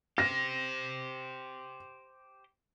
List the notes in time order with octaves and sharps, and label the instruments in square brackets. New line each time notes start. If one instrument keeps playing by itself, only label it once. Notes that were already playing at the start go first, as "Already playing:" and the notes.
[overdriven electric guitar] G4 C5 [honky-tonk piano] A#6